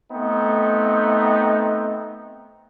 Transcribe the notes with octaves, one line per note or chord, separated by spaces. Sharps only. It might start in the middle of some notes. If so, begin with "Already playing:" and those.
A3 B3 C4 D#4